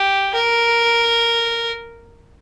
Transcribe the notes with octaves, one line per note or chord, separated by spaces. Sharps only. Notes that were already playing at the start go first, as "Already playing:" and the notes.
Already playing: G4
A#4